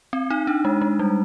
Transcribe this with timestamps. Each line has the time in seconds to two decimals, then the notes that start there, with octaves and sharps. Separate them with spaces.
0.13 C4
0.30 D#4
0.47 D4
0.65 G#3
0.81 G#3
0.99 G3